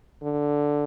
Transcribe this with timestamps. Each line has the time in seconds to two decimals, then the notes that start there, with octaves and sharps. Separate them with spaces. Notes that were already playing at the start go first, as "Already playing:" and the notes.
0.23 D3